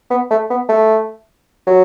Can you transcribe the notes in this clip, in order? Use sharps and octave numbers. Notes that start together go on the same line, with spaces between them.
B3
A3
B3
A3
F#3